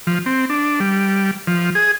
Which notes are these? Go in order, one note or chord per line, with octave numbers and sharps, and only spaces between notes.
F3
C4
D4
G3
F3
G#4